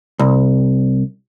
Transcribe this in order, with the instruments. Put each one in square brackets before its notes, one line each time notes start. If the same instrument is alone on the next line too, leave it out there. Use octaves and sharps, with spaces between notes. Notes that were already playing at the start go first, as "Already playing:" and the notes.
[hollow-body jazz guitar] C2